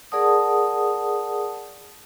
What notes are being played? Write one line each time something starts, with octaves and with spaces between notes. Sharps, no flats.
G#4 A#4 D5 F#5 A5 D#6